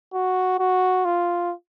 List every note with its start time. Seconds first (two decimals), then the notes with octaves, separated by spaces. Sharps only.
0.14 F#4
0.59 F#4
1.05 F4